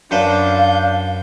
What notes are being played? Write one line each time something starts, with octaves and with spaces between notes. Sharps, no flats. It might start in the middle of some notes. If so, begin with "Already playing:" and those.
F#2 D4 B4 C5 F5 G6